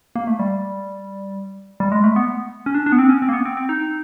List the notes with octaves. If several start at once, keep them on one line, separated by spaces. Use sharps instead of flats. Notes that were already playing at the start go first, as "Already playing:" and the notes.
A#3
A3
G3
G3
G#3
A3
B3
C#4
D4
D4
B3
C4
C#4
C4
A#3
B3
C4
C4
D#4